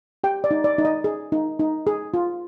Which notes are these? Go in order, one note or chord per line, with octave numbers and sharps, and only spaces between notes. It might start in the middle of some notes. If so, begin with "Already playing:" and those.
G4 G5
D5
D#4
D5
D#4
D#5
G#4
D#4
D#4
G#4
F4